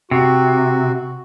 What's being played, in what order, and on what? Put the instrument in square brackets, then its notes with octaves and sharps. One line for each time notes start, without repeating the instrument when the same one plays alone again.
[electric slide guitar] C3 [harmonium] F#4